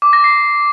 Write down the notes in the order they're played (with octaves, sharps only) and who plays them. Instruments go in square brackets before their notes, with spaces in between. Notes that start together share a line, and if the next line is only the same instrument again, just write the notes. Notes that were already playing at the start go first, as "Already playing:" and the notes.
[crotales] D6
A#6
C7